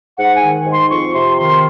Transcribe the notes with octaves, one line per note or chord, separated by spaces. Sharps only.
G#2 F#5
G#5
D#3
G#2
C6
F2 C#6
C3 C6
D#3 C6